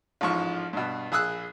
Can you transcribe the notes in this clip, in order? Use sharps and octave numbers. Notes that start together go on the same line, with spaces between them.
A1 G#2 F3 C#6
G2 B2
A#1 G#4 D#6 E6 F#6